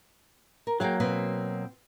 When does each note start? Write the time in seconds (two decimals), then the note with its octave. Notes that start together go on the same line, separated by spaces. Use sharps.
0.67 A#4
0.80 F#3 A#3 G#4 F5 G5
1.00 B2 C4 B4